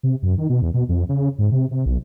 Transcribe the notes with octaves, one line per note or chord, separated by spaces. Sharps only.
C3
F#2
D#3
B2
E2
B2
F2
C#3
G#2
C3
C3
B1